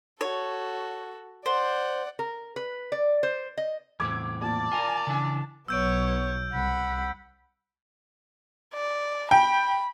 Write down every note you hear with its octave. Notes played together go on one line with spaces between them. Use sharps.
F#4 A4 C#5
C5 D5 F#5
A#4
B4
D5
C5
D#5
E2 A2 C4 D6 G#6
A#2 D5 A5
F4 A#4 G#5
C#3 E3 D4
B1 B2 F#3 B3 C#5 E6 G6 D7
C2 F#5 B5
D5
G5 B5